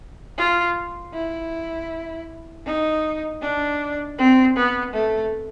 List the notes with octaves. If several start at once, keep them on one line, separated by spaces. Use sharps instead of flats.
F4
E4
D#4
D4
C4
B3
A3